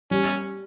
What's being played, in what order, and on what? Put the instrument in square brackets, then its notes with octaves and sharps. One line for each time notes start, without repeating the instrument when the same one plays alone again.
[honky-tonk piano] G3 [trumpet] C#4